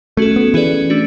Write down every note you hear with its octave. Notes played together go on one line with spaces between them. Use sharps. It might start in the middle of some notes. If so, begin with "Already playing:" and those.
A3 C#4 F#4 A4
B3
E3 C#4 G#4 B4 D5
A3 D4 F#4